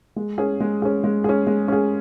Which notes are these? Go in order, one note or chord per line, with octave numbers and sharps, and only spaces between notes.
G#3
C#4 G#4
G#3
C#4 G#4
G#3
C#4 G#4
G#3
C#4 G#4